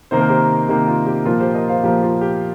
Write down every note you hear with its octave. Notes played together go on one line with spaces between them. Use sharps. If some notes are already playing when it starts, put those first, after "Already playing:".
C3 D#3 A#3 C5
A#4
G4 C5
C3 D#3 A#3 G4
F4
G4
A#2 F3 A#3 F4 A#4
G4 C5
A#4 D#5
C5 F5
A#2 F3 A#3 G4 C5
F4 A#4
G4